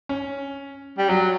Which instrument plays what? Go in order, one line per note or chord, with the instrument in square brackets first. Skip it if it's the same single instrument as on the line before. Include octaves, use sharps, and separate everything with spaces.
[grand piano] C#4
[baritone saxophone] G3
[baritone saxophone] F#3 [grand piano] F#4